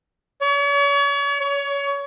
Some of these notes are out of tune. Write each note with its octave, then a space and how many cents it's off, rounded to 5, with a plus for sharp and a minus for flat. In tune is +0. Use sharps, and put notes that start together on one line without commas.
C#5 +40
C#5 +25